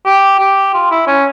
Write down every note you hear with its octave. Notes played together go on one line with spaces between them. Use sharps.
G4
G4
F4
E4
C#4